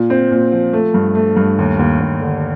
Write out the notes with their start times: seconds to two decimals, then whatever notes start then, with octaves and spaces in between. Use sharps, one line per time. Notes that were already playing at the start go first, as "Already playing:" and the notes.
Already playing: A#2
0.10 C4
0.31 A#2
0.52 F3
0.73 A3
0.94 G2
1.15 A3
1.36 G2
1.58 D#2
1.79 D#2
2.00 D#2
2.21 D3